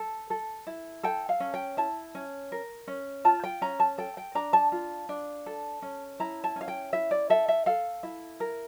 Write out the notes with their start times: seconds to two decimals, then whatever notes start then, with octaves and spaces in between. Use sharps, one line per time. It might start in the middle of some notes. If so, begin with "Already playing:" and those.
Already playing: A4
0.30 A4
0.67 E4
1.03 A4 G5
1.29 F5
1.40 C#4
1.54 G5
1.77 E4 A5
2.15 C#4
2.52 A#4
2.87 C#4
3.25 F4 A5
3.44 G5
3.62 C#4 A#5
3.80 A5
3.98 A4 G5
4.17 G5
4.35 D4 A#5
4.53 A5
4.72 F4
5.09 D4
5.46 A4
5.82 C#4
6.20 E4 A#5
6.44 A5
6.56 C#4 F5
6.68 G5
6.93 E4 E5
7.11 D5
7.30 A4 E5
7.48 E5
7.66 A4 F5
8.03 E4
8.40 A#4